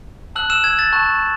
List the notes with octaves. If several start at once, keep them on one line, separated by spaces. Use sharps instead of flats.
A5 E6 F#6 F#7
E6 E7
G#6
A6
A5 C#6 F#6